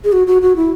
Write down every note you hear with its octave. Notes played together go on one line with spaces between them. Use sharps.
G#4
F#4
F#4
F#4
E4